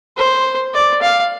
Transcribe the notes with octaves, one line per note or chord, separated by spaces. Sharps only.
C5
D5
F5